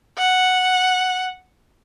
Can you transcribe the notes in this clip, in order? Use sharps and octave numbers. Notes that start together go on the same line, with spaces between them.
F#5